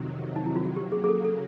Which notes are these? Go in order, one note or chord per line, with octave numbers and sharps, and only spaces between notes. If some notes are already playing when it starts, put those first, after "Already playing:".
Already playing: F2 C3 D#3 F#3
D#4
E4
F4
F#4
C#3 F#3 A#3 G4
G#4
G#4
A4
A4